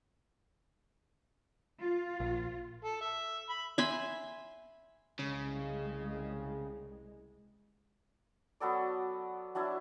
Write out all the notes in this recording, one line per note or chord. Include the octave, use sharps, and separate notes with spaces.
F4
A#1
A4
E5
B5
E5 G#5 B5 C6
C2 C#3 G#3
F#3 B3 A4 D5
F#3 D4 E4 E5